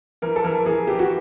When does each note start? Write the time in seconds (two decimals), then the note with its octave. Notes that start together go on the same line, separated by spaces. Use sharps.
0.22 E3 A#4
0.36 A4
0.44 E3 A#4
0.65 E3 G#4
0.87 E3 G4
0.99 F#4